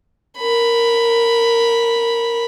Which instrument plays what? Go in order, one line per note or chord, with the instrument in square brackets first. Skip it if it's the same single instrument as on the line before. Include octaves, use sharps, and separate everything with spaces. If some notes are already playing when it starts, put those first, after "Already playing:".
[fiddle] A#4 B5